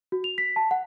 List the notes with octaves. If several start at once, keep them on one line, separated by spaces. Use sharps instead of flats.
F#4
F7
B6
A5
F#5